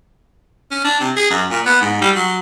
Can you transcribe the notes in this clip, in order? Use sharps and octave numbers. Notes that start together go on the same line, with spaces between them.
C#4
D4
C3
G#4
F#2
A#2
B3
G#2
G3
F#3